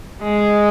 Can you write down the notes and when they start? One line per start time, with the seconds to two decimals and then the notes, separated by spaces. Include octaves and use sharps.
0.23 G#3